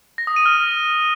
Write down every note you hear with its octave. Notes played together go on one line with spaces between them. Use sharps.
A#6
D#6
D#7
F6